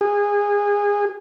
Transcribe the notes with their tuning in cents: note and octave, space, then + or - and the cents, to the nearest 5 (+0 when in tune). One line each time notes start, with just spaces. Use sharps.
G#4 -25